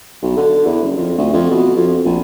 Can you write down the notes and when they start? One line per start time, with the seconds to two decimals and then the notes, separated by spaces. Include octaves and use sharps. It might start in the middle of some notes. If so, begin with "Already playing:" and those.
0.22 B1
0.37 D3
0.65 E2
0.82 F#1
0.97 F2
1.18 D2
1.33 F2
1.50 B2
1.76 F2
2.05 A#1